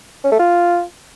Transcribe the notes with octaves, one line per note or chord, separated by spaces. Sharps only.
C#4
A3
F4